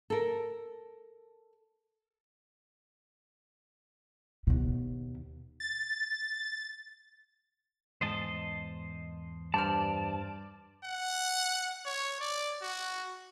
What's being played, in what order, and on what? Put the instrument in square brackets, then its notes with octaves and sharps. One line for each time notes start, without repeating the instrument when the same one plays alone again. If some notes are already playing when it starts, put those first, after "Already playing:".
[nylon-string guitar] A4 A#4
[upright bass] D#2 B2
[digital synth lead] A6
[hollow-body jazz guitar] E2 G#2 [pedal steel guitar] C5 D#5 A5
[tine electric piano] G2 C5 F6 [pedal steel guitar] D5 [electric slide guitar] A5
[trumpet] F#5
C#5
D5
F#4